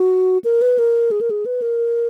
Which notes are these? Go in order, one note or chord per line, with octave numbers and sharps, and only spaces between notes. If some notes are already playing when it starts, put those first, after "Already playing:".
Already playing: F#4
A#4
B4
A#4
G#4
A#4
G#4
B4
A#4